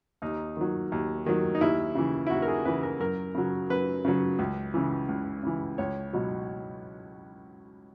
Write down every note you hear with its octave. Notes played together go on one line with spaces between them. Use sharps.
D#2 D#4
D#3 F#3
D#2
D#3 F#3
D#4
D#2 E4
C#3 E3
E4
D#2 F#4
A#4
G#4
C#3 E3 B4
A#4
F#2 A#4
C#3 F#3
F#2 B4
C#3 F#3
C#2
C#3 E3
C#2
C#3 E3
C#2 C#5
B2 F#3